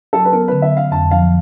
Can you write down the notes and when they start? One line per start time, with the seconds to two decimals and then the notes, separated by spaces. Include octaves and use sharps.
0.13 F#3 A4
0.25 B4
0.32 B3 A#4
0.48 D3 B4
0.62 E5
0.72 D3 F5
0.91 F2 A5
1.11 F3 F5